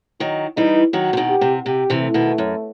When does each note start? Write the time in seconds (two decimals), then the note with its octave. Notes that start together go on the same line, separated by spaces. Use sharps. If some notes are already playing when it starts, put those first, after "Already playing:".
0.20 D#3 F#3 D#4
0.57 E3 G3 D#4
0.93 D#3 F#3 F#4
1.13 C3
1.17 B2 D#3
1.29 G4
1.41 C3
1.66 C3 G4
1.90 C3 E3
2.02 A3
2.14 B2 D#3
2.38 F#2